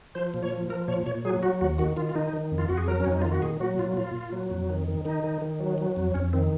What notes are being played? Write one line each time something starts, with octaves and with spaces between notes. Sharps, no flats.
F3 C5
A#2
C#5
F3
F3 A#4
A#2 C#5
A#2 C#5
F#3 G#4
F#3 F#4
D#2 F#4
D#3 F#4
D#3 F4
F4
D#3 D#4
D#3
F2
F4
F2 F#4
G#4
F#3 A#4
C#4
F2 D#4
D#3 F4
F#4
A#2 G#4
F#3 F#4
A#2 F4
A#2 F4
A#2
F#3
F2
D#3
D#3
D#3 D#4
D#3
D#3
F#3
F#3
F2
F2 C#4
D#3 C4